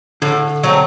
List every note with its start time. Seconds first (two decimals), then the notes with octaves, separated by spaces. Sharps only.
0.22 A2 D3
0.64 F#3 A3 C4